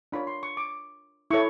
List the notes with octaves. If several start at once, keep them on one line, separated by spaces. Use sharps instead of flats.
D4 F4 A#4 C#5 B5
C6
C#6
D6
E4 A4 C#5 C#6